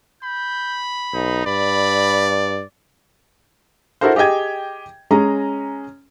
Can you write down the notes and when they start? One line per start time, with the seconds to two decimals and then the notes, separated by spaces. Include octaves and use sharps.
0.23 B5 G6
1.14 B1 D#4
1.46 G2 D5 B5
4.01 E4 F#4 A4 A#4 C5
4.16 G4 G#4 D#5 G5 G#6
5.11 G#3 C#4 G#4 A#5